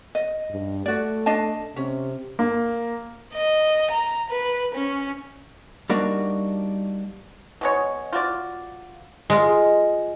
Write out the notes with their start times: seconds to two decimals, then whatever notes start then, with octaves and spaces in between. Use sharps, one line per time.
0.15 D#5
0.51 G2
0.86 A3 F#4 D5
1.26 D4 D#5 A5
1.76 C3 C#4
2.39 A#3
3.34 D#5
3.91 A#5
4.31 B4
4.75 C#4
5.90 G3 A#3 D4 D#4 F#4
7.61 B2 G#3 C#5
8.13 F4 F#4 D5
9.30 G#3 F4 D#5